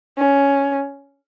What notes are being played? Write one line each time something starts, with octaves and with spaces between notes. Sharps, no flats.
C#4